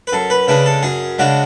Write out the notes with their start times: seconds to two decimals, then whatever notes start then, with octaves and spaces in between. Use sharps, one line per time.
0.07 B4
0.12 F#2 A4
0.30 B4
0.47 C#3 G#3 D4 B4
0.66 A4
0.83 F#2 G#4
1.18 C#3 G#3 D4 F#4